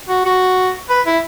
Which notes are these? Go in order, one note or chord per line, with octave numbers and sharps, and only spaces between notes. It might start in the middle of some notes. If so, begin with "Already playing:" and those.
F#4
F#4
B4
E4